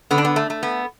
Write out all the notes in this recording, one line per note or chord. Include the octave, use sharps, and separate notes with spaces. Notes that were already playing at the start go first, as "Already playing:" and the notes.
D3 B3
D4
B3
A3
A3
B3